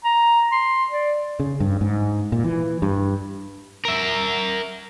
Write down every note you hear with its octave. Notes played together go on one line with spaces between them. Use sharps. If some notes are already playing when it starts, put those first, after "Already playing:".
A#5
C6
D5
C#3
G2
G#2
A#2
E3
G2
A#4 E5